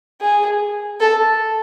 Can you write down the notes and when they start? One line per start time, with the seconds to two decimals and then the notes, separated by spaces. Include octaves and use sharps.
0.21 G#4
1.00 A4